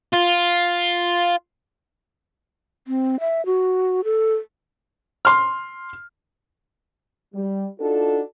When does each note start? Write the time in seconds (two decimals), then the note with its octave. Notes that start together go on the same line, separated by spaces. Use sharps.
0.13 F4
2.87 C4
3.20 E5
3.46 F#4
4.04 A4
5.25 C6 F6
7.35 G3
7.80 D4 D#4 F4 F#4 A4